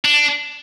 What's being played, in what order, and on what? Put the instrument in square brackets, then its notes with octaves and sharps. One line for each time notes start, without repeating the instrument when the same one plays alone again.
[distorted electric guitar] D4